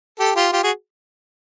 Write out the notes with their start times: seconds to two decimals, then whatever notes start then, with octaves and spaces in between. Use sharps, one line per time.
0.19 G4 A4
0.35 F4 G4
0.52 F4 G4
0.63 F#4 G#4